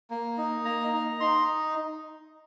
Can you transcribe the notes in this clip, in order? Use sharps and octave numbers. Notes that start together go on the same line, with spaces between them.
A#3
D#4
A#3 A#5
D#4
D#4 C6